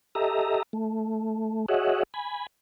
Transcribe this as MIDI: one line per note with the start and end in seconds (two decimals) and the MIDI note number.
0.15 0.63 67
0.15 0.63 69
0.15 0.63 75
0.15 0.63 76
0.15 0.63 82
0.73 1.66 57
1.69 2.03 66
1.69 2.03 68
1.69 2.03 73
1.69 2.03 75
1.69 2.03 76
1.69 2.03 78
2.14 2.47 80
2.14 2.47 83